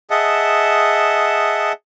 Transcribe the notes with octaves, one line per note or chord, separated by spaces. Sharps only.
G#4 D#5 E5 F#5 A5